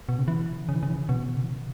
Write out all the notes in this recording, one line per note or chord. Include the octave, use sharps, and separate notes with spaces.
B2
C#3
E3
C#3
E3
C#3
E3
C#3
B2
C#3
E3
C#3